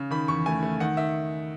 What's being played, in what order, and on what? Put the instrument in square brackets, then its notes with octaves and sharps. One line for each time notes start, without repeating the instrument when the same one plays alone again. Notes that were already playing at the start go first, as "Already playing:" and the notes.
Already playing: [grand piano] C#3
D#3 B5
E2 C#6
A3 G#5
A3
D#3 F#5
D#3 E5